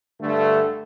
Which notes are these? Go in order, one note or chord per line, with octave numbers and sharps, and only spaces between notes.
G2 D3 A3